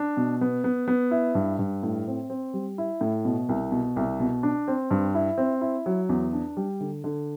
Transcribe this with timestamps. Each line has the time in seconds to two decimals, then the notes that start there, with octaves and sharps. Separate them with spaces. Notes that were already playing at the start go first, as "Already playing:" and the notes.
Already playing: D4
0.17 B2
0.41 B3
0.64 B3
0.88 B3
1.11 E4
1.35 G2
1.59 G2
1.83 A2
2.07 C4
2.30 C4
2.54 G3
2.78 E4
3.01 A2
3.25 B2
3.49 C2
3.72 B2
3.96 C2
4.20 B2
4.43 D4
4.68 C4
4.91 G2
5.15 E4
5.38 C4
5.61 E4
5.86 F#3
6.09 E2
6.33 D4
6.57 G3
6.80 D3
7.04 D3